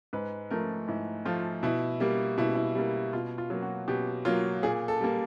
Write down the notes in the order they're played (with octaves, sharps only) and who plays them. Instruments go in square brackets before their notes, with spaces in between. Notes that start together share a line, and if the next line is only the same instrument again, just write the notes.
[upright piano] G#2 B4
F3 A3 A#4
G#2 E4
F3 A3 F4
B2 E4
G3 A#3
B2 E4
E4
G3 A#3
B2 F4
F4
F#3 A#3
F#4
B2 G4
F#3 A#3 F4
A#2 G#4
A4
G3 A#3